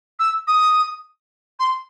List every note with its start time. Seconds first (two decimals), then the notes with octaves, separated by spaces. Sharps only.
0.20 E6
0.48 D#6
1.60 C6